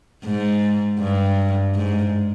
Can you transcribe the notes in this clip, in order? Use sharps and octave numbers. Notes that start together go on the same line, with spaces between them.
G#2
G2
G#2